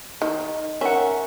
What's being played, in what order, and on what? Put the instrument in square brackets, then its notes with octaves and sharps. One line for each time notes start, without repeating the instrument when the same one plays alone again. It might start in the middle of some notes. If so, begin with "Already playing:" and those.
[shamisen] D#3 [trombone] D#4
[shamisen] C#4 [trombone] A#4 [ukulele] E5 F#5